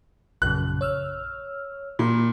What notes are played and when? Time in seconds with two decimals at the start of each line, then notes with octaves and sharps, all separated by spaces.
0.42 A#1 F#2 C#3 F#6
0.81 C#5 E6 F6
1.99 A#2 B5